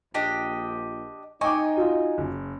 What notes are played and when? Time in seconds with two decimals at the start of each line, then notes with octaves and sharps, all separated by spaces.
0.14 A#1 D4 G4 D#5
1.41 D#4 D#5 G5 G#5 C#6 D6
1.77 F4 F#4
2.18 F#1